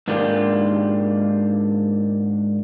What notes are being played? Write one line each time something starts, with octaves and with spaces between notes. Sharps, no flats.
G#2 D#3 A#3 D4 F4 G4